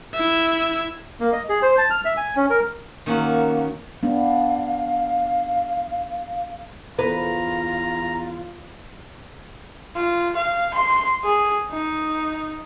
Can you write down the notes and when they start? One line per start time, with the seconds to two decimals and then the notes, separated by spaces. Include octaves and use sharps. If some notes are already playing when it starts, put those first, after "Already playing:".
0.14 E4 E5
1.20 A#3
1.33 D#5
1.49 G#4
1.62 C5
1.78 A5
1.90 F6
2.05 E5
2.17 G#5
2.36 C#4
2.50 A#4
3.06 D#3 A#3 C#4 F#4
4.03 B3 D4 F5
6.99 E2 F4 B4 A#5
9.95 F4
10.37 F5
10.74 C6
11.24 G#4
11.71 D#4